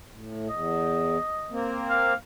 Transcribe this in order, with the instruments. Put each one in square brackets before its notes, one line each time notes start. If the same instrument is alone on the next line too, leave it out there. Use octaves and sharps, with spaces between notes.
[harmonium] A2
[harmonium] E2 [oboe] D#5
[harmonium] A#3 C4
[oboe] F5